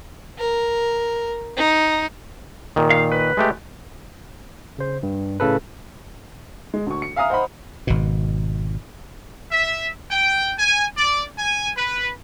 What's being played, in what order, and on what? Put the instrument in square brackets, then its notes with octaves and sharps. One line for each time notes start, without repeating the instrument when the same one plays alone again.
[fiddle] A#4
D#4
[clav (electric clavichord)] A#2 D#3
[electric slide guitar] F5
B4
[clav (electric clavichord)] G#3 A3 G4
[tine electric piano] C#3 C5
G2
A2 C#3 A4 B4
[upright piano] G#3
D2 C#6
C#7
E5 F5 G#5 A#5 D#6 F6
C5 D#5 F#5 A#5 B5
[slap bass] G#1 B2
[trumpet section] E5
G5
G#5
D5
G#5
B4